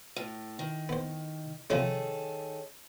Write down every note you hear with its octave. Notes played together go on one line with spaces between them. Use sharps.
A2
D#3
B3 C5
C3 D#3 F3 G#3 G#4 A4 C#5